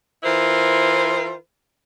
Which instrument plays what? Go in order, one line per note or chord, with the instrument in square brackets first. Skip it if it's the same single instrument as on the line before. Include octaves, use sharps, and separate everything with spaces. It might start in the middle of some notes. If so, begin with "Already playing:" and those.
[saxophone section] E3 E4 F4 A#4 C5